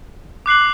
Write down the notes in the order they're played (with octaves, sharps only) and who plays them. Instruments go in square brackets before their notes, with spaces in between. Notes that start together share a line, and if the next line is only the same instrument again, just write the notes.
[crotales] D6 F#6 C7 F#7